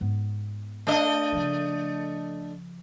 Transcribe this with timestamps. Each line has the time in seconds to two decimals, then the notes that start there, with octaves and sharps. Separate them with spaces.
0.01 G#2 B3
0.87 A3 D4 D#5
1.32 C#3 F3